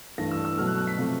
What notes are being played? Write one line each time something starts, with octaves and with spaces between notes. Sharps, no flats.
G2 E3 A3 A#6
E6
E6
B2 F#3 A3 F6
F#6
F#6
B6
C3 F3 A3